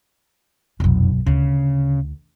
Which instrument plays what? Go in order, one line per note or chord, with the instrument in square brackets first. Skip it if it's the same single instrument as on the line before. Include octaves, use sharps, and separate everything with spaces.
[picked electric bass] F1 [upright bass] B1 F#2
[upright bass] D2 [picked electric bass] C#3